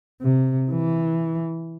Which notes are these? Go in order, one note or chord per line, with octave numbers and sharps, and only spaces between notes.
C3
E3